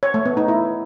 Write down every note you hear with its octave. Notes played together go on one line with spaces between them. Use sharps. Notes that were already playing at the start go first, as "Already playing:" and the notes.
C#5
A3
B3
D#4
E4